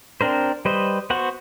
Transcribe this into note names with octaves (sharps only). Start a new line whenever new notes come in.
C4 D4 A#4 C5
G3 B4 C5 D#5
B3 F#4 C5 F#5